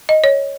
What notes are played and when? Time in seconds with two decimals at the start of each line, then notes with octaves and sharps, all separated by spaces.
0.09 D#5
0.24 C#5